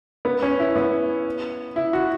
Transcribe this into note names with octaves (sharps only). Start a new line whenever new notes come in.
B3
C#4
E4
B3
E4
F#4